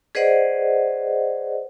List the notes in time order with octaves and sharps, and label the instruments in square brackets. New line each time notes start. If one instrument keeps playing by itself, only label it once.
[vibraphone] G#4 B4 C5 D5 D#5 F#5